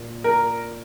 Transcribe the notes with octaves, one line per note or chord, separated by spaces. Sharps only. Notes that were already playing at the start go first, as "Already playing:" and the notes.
Already playing: A#2
A#4